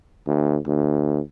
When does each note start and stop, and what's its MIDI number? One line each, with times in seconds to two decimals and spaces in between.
0.27 0.58 38
0.67 1.20 38